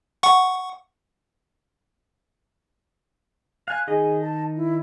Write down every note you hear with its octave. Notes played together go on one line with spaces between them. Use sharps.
F#5 C#6
F5 G#5 F#6
D#3 D#4 G#4 D#5
A5
E4